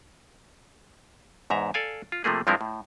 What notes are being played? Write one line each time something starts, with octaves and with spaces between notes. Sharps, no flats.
E2 G#2 E5 A#5
A4 D5 F5 G#5
F4
C3 F3 A3 A#3 G#4
G2 F3 G#3 C4 E4 A#4
A2